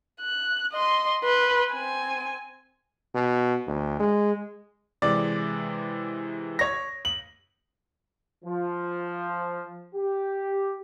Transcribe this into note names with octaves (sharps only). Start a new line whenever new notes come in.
F#6
D#5 C6
B4 C6
C4 G#5
B2
D2
G#3
C3 E3 G#3 D5
C#5 A#6
F#7
F3
G4